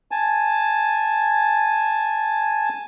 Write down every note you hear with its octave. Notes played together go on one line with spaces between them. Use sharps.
G#5 A5